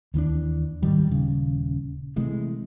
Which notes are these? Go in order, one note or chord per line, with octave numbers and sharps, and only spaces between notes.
D#2 E3 A#3 D4
G#2 D#3 G3
D#1 C#3
C3 E3 G#3 A3